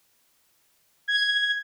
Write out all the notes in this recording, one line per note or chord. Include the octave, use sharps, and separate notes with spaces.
G#6